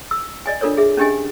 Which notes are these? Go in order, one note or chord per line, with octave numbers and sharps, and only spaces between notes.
E6
D5 D#5 G#5
D4 F4 A4 A#4 C#5
G#4 E5
C#4 D4 G4 D#5 G#5